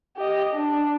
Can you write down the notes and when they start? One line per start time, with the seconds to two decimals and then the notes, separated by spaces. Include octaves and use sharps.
0.17 G4 D#5
0.53 D4